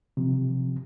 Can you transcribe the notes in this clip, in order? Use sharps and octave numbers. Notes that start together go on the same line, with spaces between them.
C3 F3